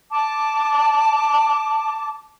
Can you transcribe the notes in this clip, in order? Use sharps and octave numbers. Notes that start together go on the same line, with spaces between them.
A5 D6